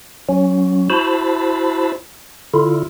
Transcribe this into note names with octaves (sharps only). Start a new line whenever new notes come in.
F#3 C#4
E4 F#4 C5 A5 B5
D3 E4 F4